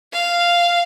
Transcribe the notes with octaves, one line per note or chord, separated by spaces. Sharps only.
F5